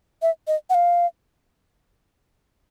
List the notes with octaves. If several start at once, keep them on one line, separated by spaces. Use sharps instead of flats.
E5
D#5
F#5
F5